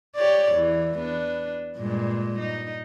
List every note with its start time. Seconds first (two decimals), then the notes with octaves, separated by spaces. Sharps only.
0.15 G4 C#5 D5
0.53 E2 E3
0.99 B3 D4
1.77 G2 A#2 G#3
2.39 D#4